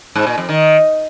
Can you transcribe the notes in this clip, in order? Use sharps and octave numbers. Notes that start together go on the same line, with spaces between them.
G#2
A#2
F2
D#3